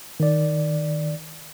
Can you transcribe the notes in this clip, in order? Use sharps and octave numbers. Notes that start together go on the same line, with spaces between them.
D#3 D5